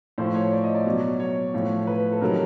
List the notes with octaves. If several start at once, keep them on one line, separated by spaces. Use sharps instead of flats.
A2 F3 C5
C#5
D5
D#5
D5
B2 F#3
C#5
A2 F3
B4
A4
C3 D#3 F#3 A#4